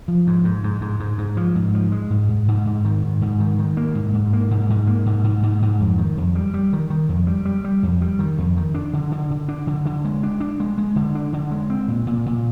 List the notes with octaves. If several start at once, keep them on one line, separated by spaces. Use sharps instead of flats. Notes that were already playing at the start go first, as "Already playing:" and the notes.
F3
G#2
G#2
G#2
G#2
G#2
G#2
F3
G#2
F3
G#3
G#2
G#2
G#2
G#2
D#3
G#2
G#2
D#3
D#3
A#3
G#2
G#2
A#3
G#2
G#2
A#3
G#2
G#2
G#2
G#2
F2
D#3
F2
G3
G3
D#3
D#3
F2
G3
G3
G3
F2
G3
D#3
F2
D#3
D4
D3
D3
D3
D4
D3
D3
G#3
D4
D4
G#3
G#3
D3
D4
D3
G#3
C4
A#2
A#2
A#2